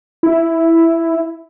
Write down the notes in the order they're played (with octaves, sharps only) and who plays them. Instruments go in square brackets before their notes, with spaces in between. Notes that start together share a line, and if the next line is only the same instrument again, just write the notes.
[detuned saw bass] E4